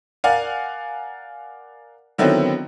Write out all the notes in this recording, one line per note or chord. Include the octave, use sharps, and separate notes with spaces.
A#4 D5 F5 F#5 G#5
D3 D#3 F#3 B3 C4 E4